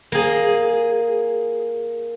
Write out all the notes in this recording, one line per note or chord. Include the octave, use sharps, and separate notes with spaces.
A#3 G#4